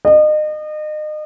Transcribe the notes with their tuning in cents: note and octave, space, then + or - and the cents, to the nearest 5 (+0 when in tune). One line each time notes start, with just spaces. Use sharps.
D#5 -35